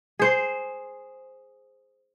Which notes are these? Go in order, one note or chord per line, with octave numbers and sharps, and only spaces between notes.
G#4 C5